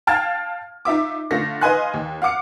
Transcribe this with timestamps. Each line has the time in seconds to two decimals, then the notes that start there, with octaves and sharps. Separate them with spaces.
0.07 F5 G5 A5 F6 G#6 A6
0.85 D#4 F4 E5 D6
1.31 D3 A3 F4 F5 A#6
1.61 B4 D#5 F5 G#5 C6 F#6
1.94 D#2
2.22 F5 F#5 D6 C#7